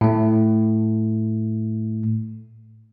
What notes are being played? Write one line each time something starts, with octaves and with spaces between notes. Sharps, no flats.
A2 A3